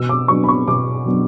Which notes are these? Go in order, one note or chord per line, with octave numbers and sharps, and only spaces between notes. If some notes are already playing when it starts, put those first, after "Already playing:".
Already playing: B2 E6
D6
F#3 B3 D4 C#6
B5
C#6
B2 D6
F#3 B3 D4